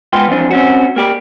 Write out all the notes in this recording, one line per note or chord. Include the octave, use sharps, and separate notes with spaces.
G#2 B3 F4 G5 C6
E3 F3 C4 D4
C4 C#4 F#4
A#3 G4 D5